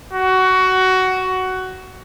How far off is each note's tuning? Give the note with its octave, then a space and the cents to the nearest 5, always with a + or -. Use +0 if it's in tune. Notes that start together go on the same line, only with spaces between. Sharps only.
F#4 +15